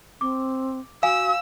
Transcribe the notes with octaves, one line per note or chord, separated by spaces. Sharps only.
C4 D6
F#4 F5 G#5 E6